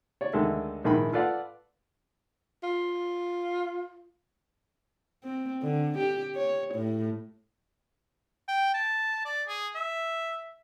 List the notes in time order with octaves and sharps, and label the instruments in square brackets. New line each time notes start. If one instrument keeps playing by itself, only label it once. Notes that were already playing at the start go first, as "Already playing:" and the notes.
[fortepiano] C#5 D5
D2 D#3 G#3 A4 E5
A#1 G#2 D#3 G#3 E4 B5
F4 A4 B4 D5 F5 F#5
[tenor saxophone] F4
[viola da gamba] C4
D3
G4
C#5
A2
[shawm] G5
A5
D5
G#4
E5